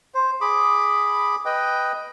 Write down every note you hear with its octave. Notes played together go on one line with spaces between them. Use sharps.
C5
G#4 B5 D6
B4 D#5 G5